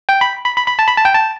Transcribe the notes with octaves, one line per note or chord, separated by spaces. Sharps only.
G5
B5
B5
B5
B5
A5
B5
A5
G5
A5